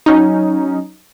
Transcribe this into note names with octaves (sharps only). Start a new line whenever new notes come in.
F#3 C#4 D#4